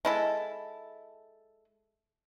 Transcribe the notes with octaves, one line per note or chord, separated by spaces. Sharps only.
G#3 E4 A4